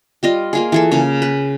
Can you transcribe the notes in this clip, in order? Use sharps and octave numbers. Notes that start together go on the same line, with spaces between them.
G3 F4 D#5
A#3 F4 G#4
E3 G#4 A4
C#3 A#3
B4